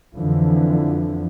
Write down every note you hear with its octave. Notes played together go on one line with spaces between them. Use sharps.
F2 D3 E3 F3